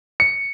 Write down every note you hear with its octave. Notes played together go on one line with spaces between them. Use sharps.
C#7